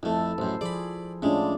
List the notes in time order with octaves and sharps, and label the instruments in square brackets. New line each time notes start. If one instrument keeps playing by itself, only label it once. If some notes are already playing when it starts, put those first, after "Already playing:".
[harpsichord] F2 A3 [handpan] E4 A4
[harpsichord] A1 F#2 [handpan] C5
[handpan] F3 G#4 [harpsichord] D5 B5
[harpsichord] A2 G#3 [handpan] C#4 D4 F4